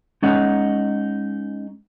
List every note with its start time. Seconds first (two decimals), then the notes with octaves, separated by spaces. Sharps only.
0.22 G#3 C#4 D#4 F#5